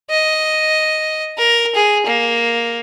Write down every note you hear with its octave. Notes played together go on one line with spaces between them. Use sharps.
D#5
A#4
G#4
A#3